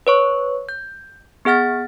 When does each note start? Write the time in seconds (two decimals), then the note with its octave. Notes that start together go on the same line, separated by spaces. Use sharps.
0.07 B4 C#5 C#6
0.69 G6
1.45 B3 G#4 F#5 F6 A6